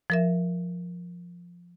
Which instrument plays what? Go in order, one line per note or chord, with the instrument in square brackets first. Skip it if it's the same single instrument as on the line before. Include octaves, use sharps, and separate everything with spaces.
[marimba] F3 A#4 E5